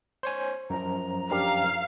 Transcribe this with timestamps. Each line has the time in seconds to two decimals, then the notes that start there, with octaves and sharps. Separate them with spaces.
0.23 C5 C#5 G#5
0.70 F#2 F3 A#5
1.31 D4 G4 A#4 F5